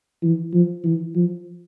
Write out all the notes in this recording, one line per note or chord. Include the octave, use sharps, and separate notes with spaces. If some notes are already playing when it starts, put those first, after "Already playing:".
E3
F3
E3
F3